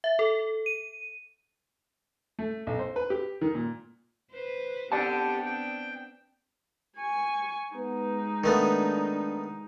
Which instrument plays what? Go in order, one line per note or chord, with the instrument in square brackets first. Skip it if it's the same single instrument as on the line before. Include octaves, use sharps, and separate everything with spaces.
[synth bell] E5
A4
D#7
[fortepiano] A3
B1
C5
B4
G4
D#3
A#2
[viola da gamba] B4 C5
[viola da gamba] B3 C4 D4 [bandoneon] G4 G5 [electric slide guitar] D5 F#5 A5
[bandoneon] G5
[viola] G#5 C#6
[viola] G#3 D#4 [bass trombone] B3
[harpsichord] D#3 A3 B3 [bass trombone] D4